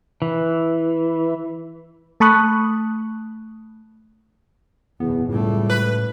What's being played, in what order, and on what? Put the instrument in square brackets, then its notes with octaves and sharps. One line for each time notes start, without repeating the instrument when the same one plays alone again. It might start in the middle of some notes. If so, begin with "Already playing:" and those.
[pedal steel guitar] E3
[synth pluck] A3 A5 B5 C#6 D#6 F#6
[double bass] F#1 B2 [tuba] E2 [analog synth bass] B3
[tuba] C#2 [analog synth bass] A2 [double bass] G3 A3
[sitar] B4